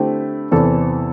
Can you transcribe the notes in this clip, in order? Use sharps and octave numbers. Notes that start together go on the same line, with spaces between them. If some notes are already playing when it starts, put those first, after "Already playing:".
Already playing: D3 A3 C4 E4 G4
E2 C3 E3 C4 A4